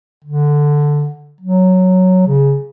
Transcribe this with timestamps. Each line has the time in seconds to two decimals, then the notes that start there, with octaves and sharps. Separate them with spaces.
0.24 D3
1.41 F#3
2.27 C#3